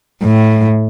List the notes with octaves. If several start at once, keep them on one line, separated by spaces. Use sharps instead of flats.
A2